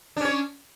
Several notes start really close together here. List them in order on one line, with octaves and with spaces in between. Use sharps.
D4 C#4 C#5